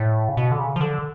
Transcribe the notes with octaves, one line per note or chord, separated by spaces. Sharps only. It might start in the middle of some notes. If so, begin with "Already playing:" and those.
Already playing: A2
C#3
B2
D3
C#3
F3
D3